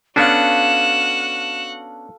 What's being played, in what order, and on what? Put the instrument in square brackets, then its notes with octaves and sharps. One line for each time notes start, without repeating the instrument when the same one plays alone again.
[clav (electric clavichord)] B3 C#4 D4 [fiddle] F#4 F#5 [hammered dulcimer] A4 F5 [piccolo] E7